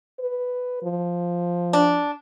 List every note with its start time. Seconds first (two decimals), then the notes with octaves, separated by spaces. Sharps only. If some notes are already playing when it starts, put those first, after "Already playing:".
0.19 B4
0.83 F3
1.73 D4